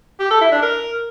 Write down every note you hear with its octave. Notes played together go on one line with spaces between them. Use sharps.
G4
A4
E4
D4
A#4